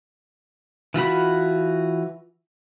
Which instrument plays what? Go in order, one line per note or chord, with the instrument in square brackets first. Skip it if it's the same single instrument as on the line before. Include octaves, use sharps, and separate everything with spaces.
[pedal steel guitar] E3 F4 F#4 B5